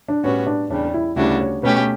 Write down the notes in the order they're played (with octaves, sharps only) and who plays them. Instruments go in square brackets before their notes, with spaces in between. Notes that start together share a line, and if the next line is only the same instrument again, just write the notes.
[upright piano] D4
[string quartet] A2 G3 B3 F#4 [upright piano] C#4
[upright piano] D4
[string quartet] E2 C#3 G3 [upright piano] D4
[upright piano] E4
[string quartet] D2 C#3 G3 D4 F#4 [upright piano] E4
[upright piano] C#5
[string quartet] B2 A3 C#4 G4 [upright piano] B4